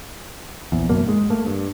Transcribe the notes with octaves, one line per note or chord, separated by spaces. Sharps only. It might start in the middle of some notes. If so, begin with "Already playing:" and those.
A#1 E2
G#1 F#2 B2 A#3
G#2 G#3
A3 A#3
G2